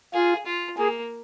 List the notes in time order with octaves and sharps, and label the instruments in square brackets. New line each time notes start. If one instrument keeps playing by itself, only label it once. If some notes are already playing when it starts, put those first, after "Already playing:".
[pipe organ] F4 [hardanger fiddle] G#4
[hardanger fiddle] F4
[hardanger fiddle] A#3 [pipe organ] G#4